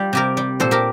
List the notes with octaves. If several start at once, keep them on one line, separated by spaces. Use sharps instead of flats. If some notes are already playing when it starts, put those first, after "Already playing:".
Already playing: G3 F4
C3 G4 A#4
G3
A#2 A4 C5
G4 A#4